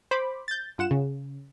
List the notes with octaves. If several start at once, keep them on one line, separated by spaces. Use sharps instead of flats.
C5 B5 D6
G6 A6
G2 F4 F#5 E7
C#3